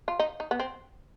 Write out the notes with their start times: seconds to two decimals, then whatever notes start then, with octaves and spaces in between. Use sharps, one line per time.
0.08 F4
0.19 D#4
0.40 D#4
0.51 B3
0.59 C4